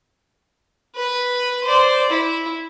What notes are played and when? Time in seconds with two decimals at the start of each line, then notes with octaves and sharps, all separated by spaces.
0.96 B4
1.63 C5 D5
2.10 E4